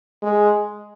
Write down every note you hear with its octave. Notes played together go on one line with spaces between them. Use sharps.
G#3